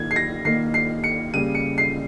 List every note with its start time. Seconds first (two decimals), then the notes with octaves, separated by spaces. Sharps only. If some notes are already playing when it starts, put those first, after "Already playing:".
Already playing: D#3 A#3 G#6
0.11 C7
0.16 A#6
0.45 D#3 A#3 C7
0.74 C7
1.04 C#7
1.34 C#3 G3 A#3 D#7
1.55 C#7
1.78 C7